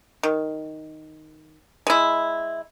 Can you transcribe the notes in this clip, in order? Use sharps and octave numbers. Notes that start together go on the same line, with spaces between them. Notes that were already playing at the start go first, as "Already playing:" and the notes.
D#3
G#3 E4